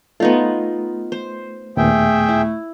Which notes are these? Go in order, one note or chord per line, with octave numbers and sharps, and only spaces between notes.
A3 B3 D#4 F4
C5
D#2 A#2 A3 B3 G#4 E5 G5
E4